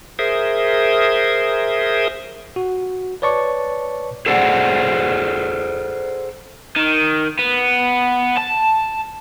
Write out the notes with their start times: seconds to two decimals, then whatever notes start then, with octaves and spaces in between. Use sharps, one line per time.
0.19 G#4 A#4 C5 E5 D#6
2.56 F#4
3.22 B4 C#5 D5 A5 C#6
4.26 G#4 A4 C5 D5 F5 F#5
6.77 D#3
7.39 B3
8.38 A5